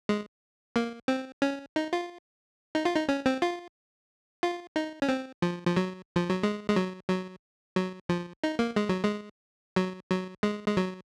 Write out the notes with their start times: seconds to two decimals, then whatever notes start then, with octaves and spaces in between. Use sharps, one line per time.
0.09 G#3
0.76 A#3
1.08 C4
1.42 C#4
1.76 D#4
1.93 F4
2.75 D#4
2.85 F4
2.96 D#4
3.09 C#4
3.26 C4
3.42 F4
4.43 F4
4.76 D#4
5.02 C#4
5.09 C4
5.42 F3
5.67 F3
5.77 F#3
6.16 F3
6.30 F#3
6.43 G#3
6.70 G#3
6.76 F#3
7.10 F#3
7.76 F#3
8.09 F3
8.44 D#4
8.59 A#3
8.76 G#3
8.89 F#3
9.04 G#3
9.76 F#3
10.10 F#3
10.43 G#3
10.67 G#3
10.77 F#3